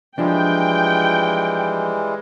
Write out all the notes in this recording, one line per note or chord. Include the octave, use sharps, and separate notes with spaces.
E3 F3 G3 G#3 D4 G5